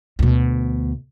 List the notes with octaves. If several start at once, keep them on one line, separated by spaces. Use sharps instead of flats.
D2 B2